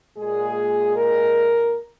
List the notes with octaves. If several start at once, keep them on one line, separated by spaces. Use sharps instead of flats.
A#2 G#3 G#4
A#4